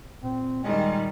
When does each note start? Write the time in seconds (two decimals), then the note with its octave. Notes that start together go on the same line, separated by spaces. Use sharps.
0.23 A#2 C4
0.64 D#3 G3 G#3